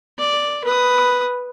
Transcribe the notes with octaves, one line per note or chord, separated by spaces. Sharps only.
D5
B4 D#6